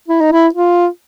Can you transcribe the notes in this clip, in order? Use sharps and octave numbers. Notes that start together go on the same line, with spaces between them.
E4
D#4
E4
F4